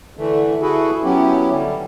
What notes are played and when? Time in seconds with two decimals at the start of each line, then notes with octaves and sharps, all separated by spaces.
0.18 D3 E3 A3
0.62 E4 F#4 G#4 A4 B4
1.04 F#3 B3 C#4 E4 G4
1.51 D3 G3